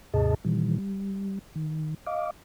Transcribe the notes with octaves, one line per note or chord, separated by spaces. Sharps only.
D#2 G#2 C3 G#4 D#5 A5
A#2 D#3 E3 G3
G3
D#3
D#5 F5 D6